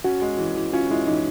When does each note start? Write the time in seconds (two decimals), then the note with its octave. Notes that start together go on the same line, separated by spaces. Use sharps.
0.04 C#4 F#4
0.22 G#3
0.38 E3
0.56 E3
0.73 C#4 F4
0.90 G#3 E4
1.07 E3 D#4